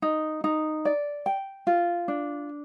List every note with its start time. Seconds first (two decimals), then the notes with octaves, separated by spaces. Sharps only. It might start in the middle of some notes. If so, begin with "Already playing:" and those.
0.02 D#4
0.44 D#4
0.85 D5
1.26 G5
1.67 F4
2.08 D4